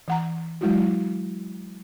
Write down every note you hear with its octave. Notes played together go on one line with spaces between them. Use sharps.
E3 F#5 A#5
F#3 G#3 E4 F#4